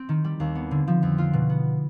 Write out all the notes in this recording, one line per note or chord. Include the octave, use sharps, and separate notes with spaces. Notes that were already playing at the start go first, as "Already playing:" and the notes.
Already playing: C4
D#3
G3
D#2
B3
D3
F3
F2
F4
B2
B3